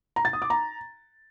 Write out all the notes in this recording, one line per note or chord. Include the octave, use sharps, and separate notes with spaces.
A#5
A6
D#6
D6
A#5